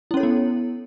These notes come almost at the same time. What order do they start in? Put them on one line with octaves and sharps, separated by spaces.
E4 C#4 C#5 A4 B3